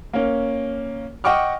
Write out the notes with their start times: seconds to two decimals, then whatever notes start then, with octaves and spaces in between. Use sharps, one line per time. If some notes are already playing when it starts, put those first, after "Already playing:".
0.13 A#3 C#4
1.24 D#5 F#5 G5 C#6 D6 F6